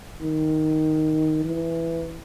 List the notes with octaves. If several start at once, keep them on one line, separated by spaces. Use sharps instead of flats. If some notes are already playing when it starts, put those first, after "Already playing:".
D#3
E3